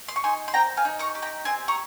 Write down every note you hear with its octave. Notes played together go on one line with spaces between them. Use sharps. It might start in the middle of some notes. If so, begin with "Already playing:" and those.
C6
C#6
D#4 G#5 C6
C6
C4 G5 A#5
F5 G#5
D#4
A#5 C#6
G4
G5 A#5
C4 G#5 C6
A#5 C#6